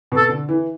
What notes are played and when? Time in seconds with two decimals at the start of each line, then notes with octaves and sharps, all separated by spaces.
0.12 B2
0.17 A4
0.29 D3
0.49 E3